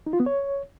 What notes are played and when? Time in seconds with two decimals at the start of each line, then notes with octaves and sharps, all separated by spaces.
0.06 D#4
0.13 F4
0.20 B3
0.26 C#5